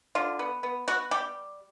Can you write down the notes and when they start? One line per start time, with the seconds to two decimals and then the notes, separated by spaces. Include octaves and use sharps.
0.15 D3 F4
0.39 B3
0.63 B3
0.88 B3 F#4
1.11 G3 G4